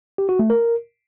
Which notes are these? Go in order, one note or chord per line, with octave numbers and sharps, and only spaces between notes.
G4
F#4
A3
A#4